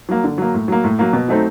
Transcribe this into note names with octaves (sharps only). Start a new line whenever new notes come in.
F#3 A#3
D3
F#3 A#3
A2
F#3 A#3
A2
F#3 A#3
B2
F#3 A3 C4 D#4